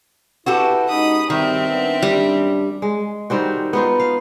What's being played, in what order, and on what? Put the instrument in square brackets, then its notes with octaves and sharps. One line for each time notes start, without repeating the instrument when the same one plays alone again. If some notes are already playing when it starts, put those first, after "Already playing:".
[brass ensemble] E4 B4 [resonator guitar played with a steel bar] F#4 G4 A4
[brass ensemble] G#3 C#4 D#4 [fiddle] B5 D#6
[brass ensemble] G2 G3 [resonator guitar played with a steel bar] D#3 [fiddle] C4 E5
[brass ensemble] B3 D4
[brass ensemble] F#2 D4 [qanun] G3
[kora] G#3
D#3 G3 C4 F#4
B3 D#4 F4
F5